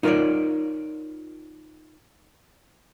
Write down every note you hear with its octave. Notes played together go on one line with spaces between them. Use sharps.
D#4 F4 A#4 B4 C#5 D5